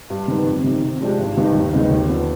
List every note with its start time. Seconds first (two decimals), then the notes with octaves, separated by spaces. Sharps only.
0.10 G2
0.28 D#3 B3
0.46 F2
0.64 C3 D#3
0.82 C3
1.01 F3 G#3 D4 G4
1.19 G#1
1.37 G2 D#3 B3 D#4
1.55 D#2
1.73 D#3 G#3 B3 D#4
1.91 D#2
2.09 D3 F3 B3